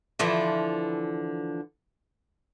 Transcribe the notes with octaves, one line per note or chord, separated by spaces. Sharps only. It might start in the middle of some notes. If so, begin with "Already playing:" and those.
D3 E3 F3